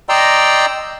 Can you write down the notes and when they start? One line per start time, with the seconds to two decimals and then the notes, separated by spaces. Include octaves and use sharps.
0.09 D5 D#5 G5 A#5 C6 E6